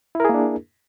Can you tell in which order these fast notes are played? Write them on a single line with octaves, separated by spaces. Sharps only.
E4 A#4 G#4 A#3 D4